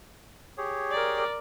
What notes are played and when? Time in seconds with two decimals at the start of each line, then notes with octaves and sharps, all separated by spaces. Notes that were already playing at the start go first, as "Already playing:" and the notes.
0.58 G4 G#4 C#5
0.91 A#4 D5